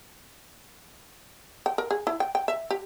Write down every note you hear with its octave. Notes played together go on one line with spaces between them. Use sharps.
G5
A#4
G#4
E4
G5
G5
E5
G4